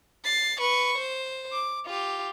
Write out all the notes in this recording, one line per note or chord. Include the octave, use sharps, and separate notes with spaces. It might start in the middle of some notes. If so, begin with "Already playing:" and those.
A6 C7
B4 C#6
C5
D6
F4 G4